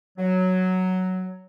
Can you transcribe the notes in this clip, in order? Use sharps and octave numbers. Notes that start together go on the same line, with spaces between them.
F#3